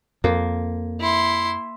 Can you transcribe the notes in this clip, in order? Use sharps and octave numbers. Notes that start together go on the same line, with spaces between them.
F2 A#3
E4 C6